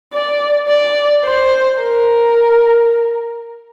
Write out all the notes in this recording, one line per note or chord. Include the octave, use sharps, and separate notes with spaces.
D5
D5
C5
A#4